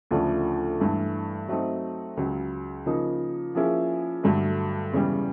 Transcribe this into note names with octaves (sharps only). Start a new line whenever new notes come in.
D2 C#3 F3 A3 D4
G2 E3 A3
F#3 A3 C4 D#4
C#2 C#3 F#3
C#3 F3 A#3 D#4
F3 A#3 C#4 E4 G#4
G2 D3 F#3 A3
E2 C#3 E3 G3